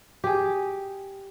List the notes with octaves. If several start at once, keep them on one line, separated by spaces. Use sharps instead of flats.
G4 G#4